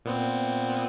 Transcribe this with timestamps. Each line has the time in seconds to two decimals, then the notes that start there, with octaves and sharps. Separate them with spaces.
0.05 A#2 B3 C4